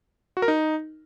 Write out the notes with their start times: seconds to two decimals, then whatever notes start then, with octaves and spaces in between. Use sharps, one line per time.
0.37 F#4
0.42 A#4
0.48 D#4